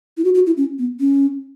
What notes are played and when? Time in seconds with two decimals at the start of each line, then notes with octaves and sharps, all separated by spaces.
0.17 E4
0.25 F#4
0.35 F#4
0.47 E4
0.57 C#4
0.79 B3
1.00 C#4